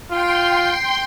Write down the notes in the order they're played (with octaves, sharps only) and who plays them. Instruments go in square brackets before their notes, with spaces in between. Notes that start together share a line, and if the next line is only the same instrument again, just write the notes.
[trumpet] F4 [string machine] G5 C6